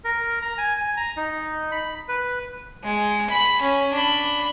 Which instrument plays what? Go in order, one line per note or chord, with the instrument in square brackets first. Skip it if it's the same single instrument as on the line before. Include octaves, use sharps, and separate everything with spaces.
[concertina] A#4
A#5
G#5
G#5
A#5
D#4
B5
B4
[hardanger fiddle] G#3
B5
C#4
D4 B5